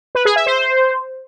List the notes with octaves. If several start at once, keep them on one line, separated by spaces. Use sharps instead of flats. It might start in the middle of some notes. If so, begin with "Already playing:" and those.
B4
G#4
E5
C5